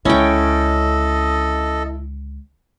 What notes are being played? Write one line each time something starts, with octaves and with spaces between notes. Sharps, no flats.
C#2 D3 C#4 E4 A4 D#5 G5